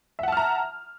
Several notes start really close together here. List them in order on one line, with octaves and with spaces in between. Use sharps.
E5 F#5 A5 F6 A#5